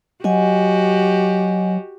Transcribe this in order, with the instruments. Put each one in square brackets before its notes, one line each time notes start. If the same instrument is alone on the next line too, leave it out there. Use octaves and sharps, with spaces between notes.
[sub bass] F#3 [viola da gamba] F#4 G4 [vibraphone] D#5 F#5 G#5